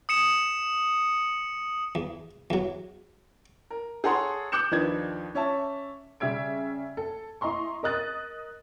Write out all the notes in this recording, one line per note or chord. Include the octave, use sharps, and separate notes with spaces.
D#6 C#7 E7
E2
E2 F#3
A#4
G#4 A4 C#5 F#5 A#5 C6
D6 F#6 G6 C#7 E7
D#2 F3 D4 D#4 B4 G#6
C#4 C#5 E5 A5
C#3 G3 E5 G#6 D7
A4
E4 D#5 A#5 C6 C#6
A#4 D#5 D#6 F#6 A6